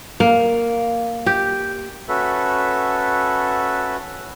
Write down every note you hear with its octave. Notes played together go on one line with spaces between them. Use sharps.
A#3
G4
C#4 F#4 A4 B4 E5